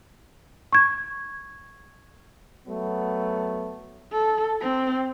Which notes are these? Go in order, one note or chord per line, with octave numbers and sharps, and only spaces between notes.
C#6 G#6
F#3 A3 B3
A4
C4